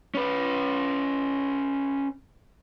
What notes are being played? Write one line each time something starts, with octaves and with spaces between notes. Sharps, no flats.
C#4 B4